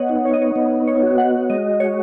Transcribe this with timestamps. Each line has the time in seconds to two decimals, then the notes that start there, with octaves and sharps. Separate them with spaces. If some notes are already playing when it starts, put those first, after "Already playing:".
Already playing: B3 C#5 D#5 F#5
0.09 D#4
0.25 C#5
0.33 D#5
0.42 C#5
0.56 B3
0.87 C#5
1.03 F#4
1.18 F#5
1.50 G#3 D#5
1.80 C#5